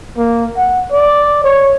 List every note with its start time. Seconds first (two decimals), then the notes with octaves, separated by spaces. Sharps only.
0.17 A#3
0.57 F#5
0.92 D5
1.44 C#5